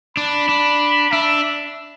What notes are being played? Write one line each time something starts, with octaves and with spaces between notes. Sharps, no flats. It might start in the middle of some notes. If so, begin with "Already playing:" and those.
D4 B5
D4
D4 E5